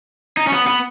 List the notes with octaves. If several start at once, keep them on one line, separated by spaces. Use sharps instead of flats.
D#4
C#4
B3
B3